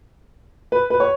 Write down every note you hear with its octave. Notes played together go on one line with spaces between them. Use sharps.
B4
B4
C#5